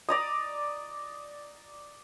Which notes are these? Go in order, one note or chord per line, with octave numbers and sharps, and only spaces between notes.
D5 A#5 D#6